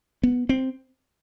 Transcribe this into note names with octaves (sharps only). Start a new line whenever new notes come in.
B3
C4